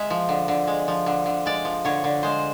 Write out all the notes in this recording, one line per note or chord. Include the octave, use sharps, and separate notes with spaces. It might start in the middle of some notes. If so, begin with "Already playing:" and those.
Already playing: G#3 E5
F3
D3
D3
G#3
F3
D3
D3
G#3 D5
F3
D3 C#5
D3
G#3 C5